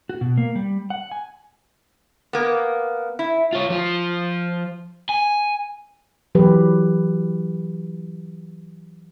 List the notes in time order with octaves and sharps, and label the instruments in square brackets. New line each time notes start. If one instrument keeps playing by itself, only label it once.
[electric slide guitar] F#4
B2
A#3
G3
F#5
G#5
[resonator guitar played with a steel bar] A#3 B3
E4
[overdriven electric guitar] F4 C#5
F3 F4
G#5
[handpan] E3 F#3 G4 B4